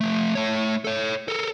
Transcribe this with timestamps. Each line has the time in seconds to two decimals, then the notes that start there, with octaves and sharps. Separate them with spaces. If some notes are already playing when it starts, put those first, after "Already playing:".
0.01 F3 A3
0.35 A3 C#5
0.85 A4 C#5
1.28 A4 A#4